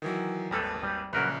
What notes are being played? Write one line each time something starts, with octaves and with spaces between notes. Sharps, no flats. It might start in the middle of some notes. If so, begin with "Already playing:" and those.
D#3 E3 F#3
G#1 D#2 G3 A4 B4
G3
A#1 C#3 F#3 A#4 B4